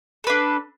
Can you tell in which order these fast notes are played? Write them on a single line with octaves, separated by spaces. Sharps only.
A4 B4 D4